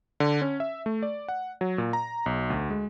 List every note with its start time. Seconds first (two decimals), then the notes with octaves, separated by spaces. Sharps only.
0.20 D3
0.42 C#4
0.60 E5
0.86 A3
1.03 D5
1.28 F#5
1.61 F#3
1.78 A#2
1.93 A#5
2.26 B1
2.50 D2
2.70 G#3